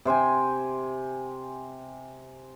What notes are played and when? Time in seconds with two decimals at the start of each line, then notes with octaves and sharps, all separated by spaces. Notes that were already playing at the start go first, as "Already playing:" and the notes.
0.05 C3 C5 G5 G#5